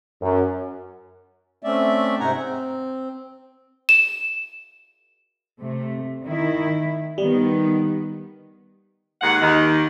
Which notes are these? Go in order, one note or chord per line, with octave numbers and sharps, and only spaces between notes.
F#2
A3 C4 C#4 D5 E5
G#2 C3 D#4 F#5 G#5 A#5
C4
E7
C3 A3
D#3 E4
D#3 G3 B3
D#2 G#3 F#5
D#2 D#3